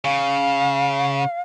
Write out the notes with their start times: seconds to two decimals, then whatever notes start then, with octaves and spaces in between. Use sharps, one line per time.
0.05 C#3 F5